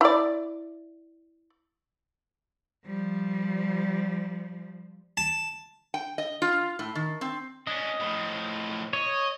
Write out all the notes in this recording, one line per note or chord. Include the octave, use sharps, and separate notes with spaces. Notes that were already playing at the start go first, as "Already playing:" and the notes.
E4 D5
F3 G3
A5
G5
D#5
F4
A2
D#3
C4
C#4 D4 D#5
A2 F3
C#5 D#5